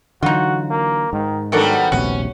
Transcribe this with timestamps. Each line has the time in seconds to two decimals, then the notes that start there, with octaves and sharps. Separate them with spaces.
0.22 D3 E3 F#3 D#4 F4 F#4
0.70 A#3
1.13 G#2 D#3
1.52 D#3 F#3 G3 B3 D4 A4 A#4
1.92 D#1 A#1 C3 C#4 F#4